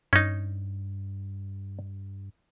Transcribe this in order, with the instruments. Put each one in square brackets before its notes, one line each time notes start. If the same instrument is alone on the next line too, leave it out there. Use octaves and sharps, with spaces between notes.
[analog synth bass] G2 [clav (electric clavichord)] C#4 D#4